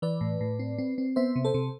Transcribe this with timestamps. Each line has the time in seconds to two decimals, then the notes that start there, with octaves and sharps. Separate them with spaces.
0.02 E3 B4 D5
0.21 A2
0.41 A2
0.59 C4
0.78 C4
0.98 C4
1.16 B3 C5 E5
1.36 C3
1.45 A4 C5
1.54 C3